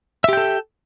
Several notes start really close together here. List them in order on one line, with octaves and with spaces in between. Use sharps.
E5 G4 G5 A4